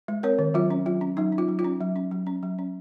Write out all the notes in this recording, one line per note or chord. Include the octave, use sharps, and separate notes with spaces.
G#3
C4 A#4 C#5
D#3
F#3 F4
C#4
F#3 F4
C#4
F#3 D#4
C#4
F4
F#3
F4
C#4
F#3
C#4
F#3
C#4
F#3
C#4